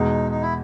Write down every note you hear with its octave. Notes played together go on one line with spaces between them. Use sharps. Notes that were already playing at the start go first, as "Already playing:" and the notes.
Already playing: E2 B2 G#3 D#4
D#4
E4